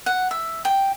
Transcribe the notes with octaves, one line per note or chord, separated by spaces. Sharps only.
F#5
E5
G5